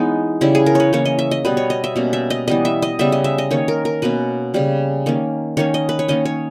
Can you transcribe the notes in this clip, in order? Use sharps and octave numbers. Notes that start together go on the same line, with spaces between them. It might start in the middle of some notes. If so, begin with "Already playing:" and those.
Already playing: E3 G#3 B3 C#4 D#4
C#3 G3 C#4 E4
G#4
A#4
B4 C#5
E3 A#3 C#4 C#5
D#5
E5
D#5
B2 G3 B3 B4
C#5
D#5
E5
B2 G3 A#3 C#4
E5
D#5
E3 G3 B3 D#5
E5
D#5
C#3 G3 B3 E5
D#5
E5
D#5
D#3 A#3 C#4 C#5
A#4
A#4
B2 A#3 C#4 B4
C#3 G3 C#4
D#3 A#3 C#4
D#3 A#3 C#4 C#5
D#5
B4
C#5
D#3 A#3 C#4 D#5
C#5